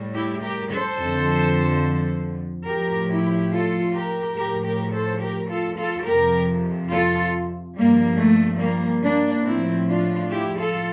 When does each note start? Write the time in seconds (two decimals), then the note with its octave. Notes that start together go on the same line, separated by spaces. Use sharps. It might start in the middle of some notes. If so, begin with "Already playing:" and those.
Already playing: A2 G3
0.14 E4 G4
0.43 G4 A#4
0.71 A4 C5
0.99 F2 D3 F3
2.69 A2 F3 G4 A#4
3.11 E4 G4
3.53 F4 A4
3.95 G4 A#4
4.37 A2 F3 G4 A#4
4.66 G4 A#4
4.94 A4 C5
5.22 G4 A#4
5.50 F4 A4
5.79 F4 A4
6.07 F2 C3 F3 G4 A#4
6.92 F4 A4
7.76 G2 F3 G3 A#3
8.19 A3
8.61 G3 A#3
9.03 A#3 D4
9.45 A2 F3 C4 E4
9.88 D4 F4
10.30 E4 G4
10.58 F4 A4